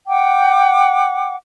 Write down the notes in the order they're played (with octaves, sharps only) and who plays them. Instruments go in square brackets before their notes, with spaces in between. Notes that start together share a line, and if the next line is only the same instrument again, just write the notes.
[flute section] F#5 G5 D6